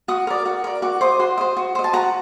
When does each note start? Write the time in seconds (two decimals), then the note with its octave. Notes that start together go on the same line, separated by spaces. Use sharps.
0.08 F#4 D#6
0.27 A#4 D5
0.46 F#4
0.64 A#4 D5
0.82 F#4 D6
1.01 C5 D#5 D6
1.19 F#4 C6
1.38 C5 D#5
1.57 F#4
1.75 C5 D#5
1.84 A5
1.93 F#4 A#5